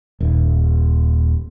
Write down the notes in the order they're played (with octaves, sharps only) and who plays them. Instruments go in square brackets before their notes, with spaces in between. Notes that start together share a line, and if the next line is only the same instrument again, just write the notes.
[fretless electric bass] D#1